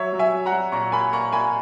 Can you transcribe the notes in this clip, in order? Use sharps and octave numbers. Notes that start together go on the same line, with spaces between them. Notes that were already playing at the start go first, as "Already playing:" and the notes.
Already playing: F#3 C#5 E5
F#3
E5 G#5
F#3
F#5 A#5
F#3
A#2 A#5 C#6
A#3 G#5 B5
A#3 A#5 C#6
A#3 G#5 B5